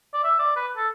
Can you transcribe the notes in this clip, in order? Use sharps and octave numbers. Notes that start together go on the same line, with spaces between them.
D5
E5
D5
B4
A4